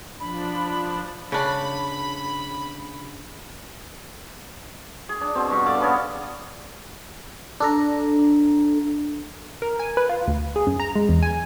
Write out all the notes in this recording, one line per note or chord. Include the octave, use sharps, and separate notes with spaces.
F3 D4 B5
C#3 D4 B5
G#4
D4
B2 C4
G2 C#6
A4 D5 F5 A5
B3 C#4 G#4 A4
D4 A4 A#5
A#4
G#5
B4
F4
D2
G#4
F#2
A#5
G#3
E2
G#5